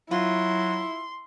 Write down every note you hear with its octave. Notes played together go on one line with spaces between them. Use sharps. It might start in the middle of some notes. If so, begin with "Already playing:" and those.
F#3 E4 F4 C6